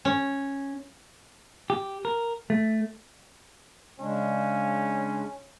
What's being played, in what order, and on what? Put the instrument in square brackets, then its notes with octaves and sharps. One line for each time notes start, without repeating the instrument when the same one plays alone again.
[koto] C#4
[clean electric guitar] G4
A#4
A3
[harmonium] C#3 G#3 D4 [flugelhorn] C#4